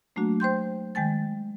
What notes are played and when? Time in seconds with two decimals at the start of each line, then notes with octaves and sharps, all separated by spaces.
0.16 F#3 A3 A#3 D4 F#4
0.40 C5 G5 C6 G6
0.95 D#3 G#3 G5 G#5 A6